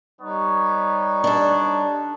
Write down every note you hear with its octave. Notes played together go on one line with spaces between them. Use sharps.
G3 B3 D#4 C#5 C#6
D4 A4